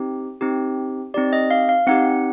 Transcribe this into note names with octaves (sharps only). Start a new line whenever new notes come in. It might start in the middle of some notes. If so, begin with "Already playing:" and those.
Already playing: C4 D#4 G4
C4 D#4 G4
C4 D#4 G4 D5
D#5
F5
F5
C4 D#4 G4 F#5